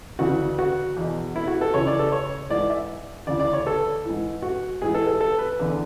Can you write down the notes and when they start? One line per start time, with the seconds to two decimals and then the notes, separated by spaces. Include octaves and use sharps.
0.19 D2 C#3 E3 F#4
0.59 F#4
0.96 E2 B2
1.36 E4
1.48 F#4
1.61 A4
1.74 C#2 C#3 E3 C#5
1.87 D5
1.99 A4
2.12 C#5
2.50 G#2 E3 D5
2.69 E5
3.27 D2 C#3 E3 D5
3.40 D5
3.53 C#5
3.67 A4
4.05 G#2 E3
4.42 F#4
4.82 G#2 E3 G#4
4.94 A4
5.07 A4
5.21 A4
5.39 B4
5.59 E2 D3